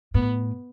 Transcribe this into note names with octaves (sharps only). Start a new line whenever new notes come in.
A2 B3